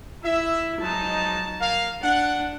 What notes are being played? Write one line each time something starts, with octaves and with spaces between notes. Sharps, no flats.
E4 E5
F3 F#3 G#3 D#4 A5
A#3 F5
D4 F#5